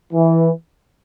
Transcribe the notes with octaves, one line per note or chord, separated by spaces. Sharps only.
E3